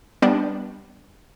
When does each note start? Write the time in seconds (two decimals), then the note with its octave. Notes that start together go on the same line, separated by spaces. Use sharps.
0.22 G3 B3 D4